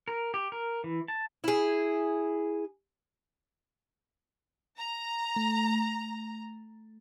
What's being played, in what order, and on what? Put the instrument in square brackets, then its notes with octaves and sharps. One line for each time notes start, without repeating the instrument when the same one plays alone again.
[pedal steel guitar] A#4
G4
A#4
E3
A5
[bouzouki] E4 G#4
[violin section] A#5
[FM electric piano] A3